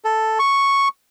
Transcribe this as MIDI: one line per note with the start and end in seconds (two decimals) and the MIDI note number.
0.04 0.39 69
0.39 0.88 85